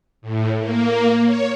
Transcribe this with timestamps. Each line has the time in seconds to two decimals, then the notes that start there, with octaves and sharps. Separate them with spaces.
0.21 A2
0.59 A#3
1.24 C#5